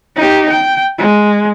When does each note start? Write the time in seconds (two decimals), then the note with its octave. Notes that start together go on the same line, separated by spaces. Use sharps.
0.16 D#4 G4
0.50 G5
0.98 G#3